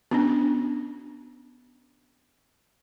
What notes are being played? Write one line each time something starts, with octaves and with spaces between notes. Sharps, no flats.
B3 C#4 D4